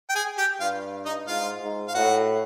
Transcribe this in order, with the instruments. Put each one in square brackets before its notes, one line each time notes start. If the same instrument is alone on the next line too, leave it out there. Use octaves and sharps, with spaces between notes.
[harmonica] G5
G#4 G#5
G4 G5
[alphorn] G2 [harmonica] F4 F5
[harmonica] D#4 D#5
[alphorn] G#2 [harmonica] F4 F5
[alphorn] G#2
[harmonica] F5
[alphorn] A2 [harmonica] F#4 F#5